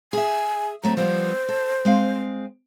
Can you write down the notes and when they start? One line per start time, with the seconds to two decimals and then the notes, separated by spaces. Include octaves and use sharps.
0.13 G#4 E5 G#5
0.83 F#3 A3 C4 A#5
0.97 F3 G3 B3 C5
1.49 A4
1.85 G#3 C4 F5